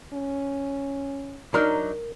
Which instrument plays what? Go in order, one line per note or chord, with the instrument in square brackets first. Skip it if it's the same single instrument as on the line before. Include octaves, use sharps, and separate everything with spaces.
[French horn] C#4
[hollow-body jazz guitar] F#3 D4 D#4 [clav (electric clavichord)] A#4